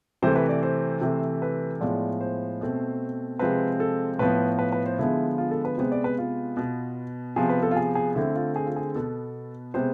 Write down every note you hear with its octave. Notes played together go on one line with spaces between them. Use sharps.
C3 E3 A3 C5
B4
D5
C5
C3 E3 A3
B4
A2 F3 G#3 B3 D5
C5
B2 A3 C4
C3 F3 G#3 C4 B4
A4
A2 F3 B3 B4
B4
B4
C5
D3 F3 G#3 B3 E4
F4
A4
B4
C3 G#3 B3 C5
D5
B4
F4
B2 B3
C3 F3 B3 G#4
B4
A4
F4
G#4
G#4
D3 A3 C4 E4
F4
G#4
F4
G#4
B2 B3 A4
C3 G#3 B3 C5